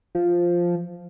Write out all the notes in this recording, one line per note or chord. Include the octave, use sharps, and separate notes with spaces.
F3